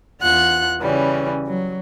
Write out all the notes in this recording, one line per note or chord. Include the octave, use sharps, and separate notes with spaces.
E2 F4 F#5 F#6
C#3 E3 G3 C#4
F#3